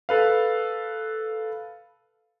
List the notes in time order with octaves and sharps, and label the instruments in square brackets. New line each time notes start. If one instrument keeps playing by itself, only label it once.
[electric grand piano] A4 B4 F5